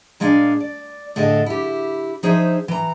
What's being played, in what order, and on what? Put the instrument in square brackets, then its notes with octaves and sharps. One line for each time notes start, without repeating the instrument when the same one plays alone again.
[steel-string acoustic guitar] A#2 G#3 D4 F5 G#5
D5
A2 D3 G#4 A4 D#5 A5
E4 G4
F3 D#4 G#4 C5 C#5 E5
E3 A#5